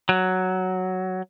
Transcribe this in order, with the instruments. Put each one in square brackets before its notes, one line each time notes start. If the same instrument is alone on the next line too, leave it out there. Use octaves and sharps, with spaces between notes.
[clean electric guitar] F#3